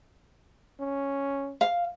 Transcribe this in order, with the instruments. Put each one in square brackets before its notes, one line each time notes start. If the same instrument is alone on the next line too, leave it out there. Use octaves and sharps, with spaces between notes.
[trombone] C#4
[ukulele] F5